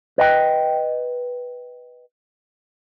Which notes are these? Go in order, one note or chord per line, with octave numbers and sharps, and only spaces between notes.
B4 D#5 G5